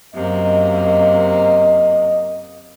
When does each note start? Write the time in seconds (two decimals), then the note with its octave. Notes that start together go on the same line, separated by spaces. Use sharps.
0.15 F#2 C3 A#3 D#5